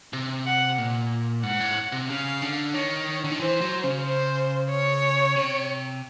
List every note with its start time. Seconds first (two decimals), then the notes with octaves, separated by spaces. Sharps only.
0.13 C3
0.46 F#5
0.78 A#2
1.43 G#2 F#5
1.60 A2
1.92 C3
2.09 C#3 F5
2.42 D3
2.74 D#3 C#5
3.24 D3
3.32 D#3
3.40 E3 C5
3.61 F#3
3.84 C#3
4.05 C5
4.70 C#5
5.36 C3